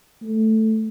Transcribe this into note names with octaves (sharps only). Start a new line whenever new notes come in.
A3